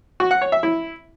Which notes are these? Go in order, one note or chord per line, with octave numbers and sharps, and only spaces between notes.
F#4
F#5
C#5
E5
E4